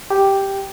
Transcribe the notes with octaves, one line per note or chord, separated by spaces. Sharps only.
G4